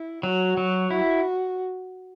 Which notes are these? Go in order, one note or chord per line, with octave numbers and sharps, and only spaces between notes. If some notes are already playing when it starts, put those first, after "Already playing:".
Already playing: E4
F#3 F#4
F#3
E4 F#4